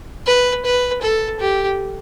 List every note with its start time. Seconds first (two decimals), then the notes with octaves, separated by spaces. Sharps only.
0.27 B4
0.65 B4
1.02 A4
1.40 G4